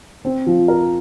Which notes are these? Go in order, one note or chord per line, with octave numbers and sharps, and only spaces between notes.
C4
F3
A#4